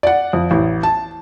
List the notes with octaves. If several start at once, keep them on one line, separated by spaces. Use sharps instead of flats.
D5 F#5
F2
A1
A5